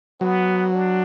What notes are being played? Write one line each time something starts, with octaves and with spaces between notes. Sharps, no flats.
F#3 B3
D4